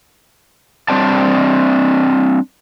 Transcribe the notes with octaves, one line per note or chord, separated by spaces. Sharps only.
G3 C4 D4 G5 A5